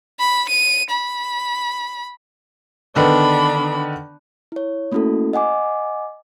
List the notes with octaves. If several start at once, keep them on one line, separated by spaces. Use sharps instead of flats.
B5
D#7
B5
D3 D#3 B3 D4 B5
E4 C#5
A3 A#3 C#4 E4 F#4 A4
D#5 F#5 G#5 D6